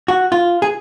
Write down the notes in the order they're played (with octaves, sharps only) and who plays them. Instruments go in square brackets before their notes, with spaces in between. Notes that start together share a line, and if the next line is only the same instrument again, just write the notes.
[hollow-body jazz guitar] F#4
F4
G#4